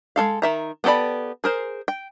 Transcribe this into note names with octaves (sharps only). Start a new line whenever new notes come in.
G#3 C#4 A4 F5
D#3 E5 A#5
B3 G4 A4 D5 B5
G#4 A#4 C5
G5